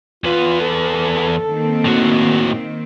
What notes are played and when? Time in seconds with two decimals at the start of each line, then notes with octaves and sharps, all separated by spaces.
0.24 E2 F4 B4
0.60 A4
1.46 D#3 A#3 C4
1.85 A2 F#4